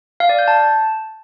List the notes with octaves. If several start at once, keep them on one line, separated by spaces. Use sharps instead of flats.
F5
D5
G6
A5